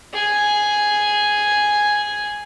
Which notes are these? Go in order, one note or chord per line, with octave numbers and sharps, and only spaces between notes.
G#4 G#5